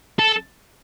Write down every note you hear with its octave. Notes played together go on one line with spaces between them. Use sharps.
A4